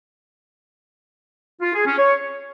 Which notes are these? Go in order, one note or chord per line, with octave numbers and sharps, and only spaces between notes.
F4
G#4
C#4
C#5